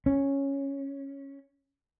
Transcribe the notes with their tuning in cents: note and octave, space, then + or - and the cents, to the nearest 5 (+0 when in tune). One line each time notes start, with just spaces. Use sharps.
C#4 -5